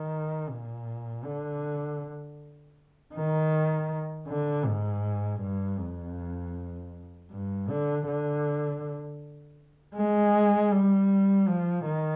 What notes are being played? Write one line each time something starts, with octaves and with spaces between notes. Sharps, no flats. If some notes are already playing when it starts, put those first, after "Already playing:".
Already playing: D#3
A#2
D3
D#3
D3
G#2
G2
F2
G2
D3
D3
G#3
G3
F3
D#3